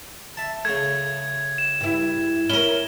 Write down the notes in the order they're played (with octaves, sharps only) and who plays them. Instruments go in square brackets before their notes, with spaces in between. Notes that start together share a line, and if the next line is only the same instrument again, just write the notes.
[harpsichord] E5 A5
[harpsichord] C#3 A3 [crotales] G#6
[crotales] E7
[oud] G2 E4
[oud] C#4 A#4 [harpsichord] E4 [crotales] G7